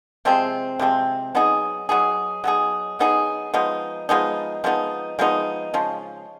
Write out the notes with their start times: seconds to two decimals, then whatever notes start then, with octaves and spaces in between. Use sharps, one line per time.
0.25 C3 F3 G#3 C4
0.79 C3 F3 G#3 C4
1.35 F#3 B3 D#4 G#4
1.89 F#3 B3 D#4 G#4
2.44 F#3 B3 D#4 G#4
2.99 F#3 B3 D#4 G#4
3.54 F3 G#3 B3 D#4
4.09 F3 G#3 B3 D#4
4.64 F3 G#3 B3 D#4
5.19 F3 G#3 B3 D#4
5.74 C#3 F3 G#3